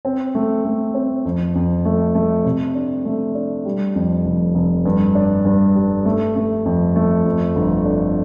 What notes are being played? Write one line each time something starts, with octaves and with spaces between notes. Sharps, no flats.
C4
A3
A3
C4
F2
F2
A3
A3
C3
D4
A3
D4
G3
F2
F1
F1
G2
D4
G2
G3
A3
A3
F2
A3
F2
G1
D4